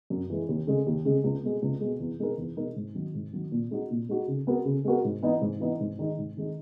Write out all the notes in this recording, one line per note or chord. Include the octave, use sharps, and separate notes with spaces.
F#2
E3 G#3
D#2
C#3 G#3
D#2
C#3 G#3
C#2
B2 G#3
C#2
B2 G#3
E2
B2 G#3 D#4 A#4
E2
B2 G#3 D#4 A#4
G#2
D#3 F#3
G#2
D#3 F#3
A#2
G#3 D#4 F#4
A#2
G#3 D#4 F#4
C#3
G#3 B3 F#4 A#4
C#3
G#3 B3 F#4 A#4
G#2
E3 B3 D#4
G#2
E3 B3 D#4
G#2
D#3 G#3 D#4
G#2
D#3 G#3 D#4